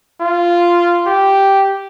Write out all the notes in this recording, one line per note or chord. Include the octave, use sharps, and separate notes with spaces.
F4
G4